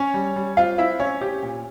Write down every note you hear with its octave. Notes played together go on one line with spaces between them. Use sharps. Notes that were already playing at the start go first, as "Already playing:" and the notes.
Already playing: C#4 C#5
G3
G3
C4 F4 F5
C4 E4 E5
C4 C#4 C#5
C#4 G4
A#2